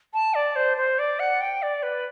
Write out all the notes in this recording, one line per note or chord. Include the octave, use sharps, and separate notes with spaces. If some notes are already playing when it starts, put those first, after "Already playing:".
A5
D5
C5
C5
D5
F#5
G5
D5
B4